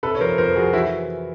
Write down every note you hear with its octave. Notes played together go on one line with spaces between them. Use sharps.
C3 A4 B4
C#5
F3 A#4 C5
F2 A#4 C5
F2 F#4 G#4
E3 E4 F#4